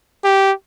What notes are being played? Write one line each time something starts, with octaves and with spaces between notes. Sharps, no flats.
G4